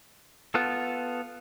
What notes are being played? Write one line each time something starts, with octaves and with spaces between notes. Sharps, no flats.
B3 F4 A4